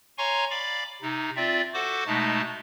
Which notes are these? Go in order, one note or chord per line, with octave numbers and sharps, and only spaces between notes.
C#5 F5 G#5 A#5 C6 C#6
D5 F5 B5 D6
C3 D#4
C4 F4 D5 E5
F#4 A4 C5 F#5 D6
B2 G#3 A3 D#4 A5